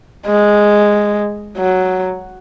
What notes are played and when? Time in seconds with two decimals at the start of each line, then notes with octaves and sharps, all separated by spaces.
0.27 G#3
1.57 F#3